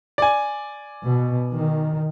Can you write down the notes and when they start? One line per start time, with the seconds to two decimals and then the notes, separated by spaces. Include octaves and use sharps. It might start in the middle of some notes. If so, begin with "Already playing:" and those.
0.18 D5 G#5
1.05 B2
1.54 D#3